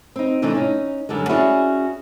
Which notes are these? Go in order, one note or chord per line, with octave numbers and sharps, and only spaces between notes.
C4 D#4
C3 E3 A3 D4 D#4
C#4 D#4
F#2 D3 G3 G#3
C#4 E4 F#4 G#4 D5